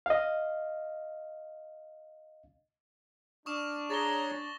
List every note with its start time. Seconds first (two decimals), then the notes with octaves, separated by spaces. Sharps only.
0.06 D#5 F5
3.46 D4 C#6 D#6 F6 E7
3.90 G#4 C#5 A#5 A6 A#6 G7